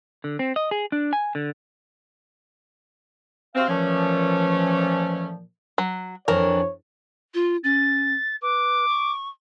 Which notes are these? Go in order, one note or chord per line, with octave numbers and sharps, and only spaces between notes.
D3
C4
D#5
G#4
D4
G#5
D3
C3 C4 F#4 F5
A#2 E3 F3 A3 C#4
F#3
F2 E3 D4 A#4 C#5
F4
C#4 A6
B4 D6
C#6